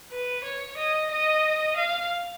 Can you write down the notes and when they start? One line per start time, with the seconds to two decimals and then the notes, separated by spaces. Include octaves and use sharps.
0.12 B4
0.44 C#5
0.78 D#5
1.11 D#5
1.77 F5